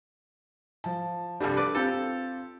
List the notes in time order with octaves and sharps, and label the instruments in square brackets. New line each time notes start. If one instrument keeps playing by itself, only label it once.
[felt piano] F3 A5
[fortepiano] C2 G2 G3 [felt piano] D4 A4
[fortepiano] B4 D5
[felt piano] C4 F4 [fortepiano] G4 A4